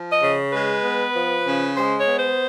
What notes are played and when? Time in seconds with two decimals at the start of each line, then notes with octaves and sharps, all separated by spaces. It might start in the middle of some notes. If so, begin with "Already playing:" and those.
Already playing: F3
0.12 D#5
0.22 C#3
0.53 G#3 B4
0.84 B3
1.15 F3
1.46 C#3
1.76 G#3 C5
1.98 C#5
2.07 B3
2.18 C5